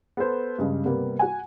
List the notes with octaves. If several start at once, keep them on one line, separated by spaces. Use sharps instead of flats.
B3 A4 C5
G2 C#3 G#3
C3 G3 A#3 B3
F#4 F#5 G#5